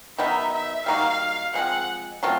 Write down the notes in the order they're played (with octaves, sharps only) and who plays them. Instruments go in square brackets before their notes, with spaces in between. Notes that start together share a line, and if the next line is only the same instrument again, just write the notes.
[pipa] D#3 F#3 B3 D#4 [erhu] E5
[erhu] E5
[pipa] G3 A#3 D#4 F#4 [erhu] F5
[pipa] F3 G#3 C4 [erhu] F#5
[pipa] F#3 A3 C4 F4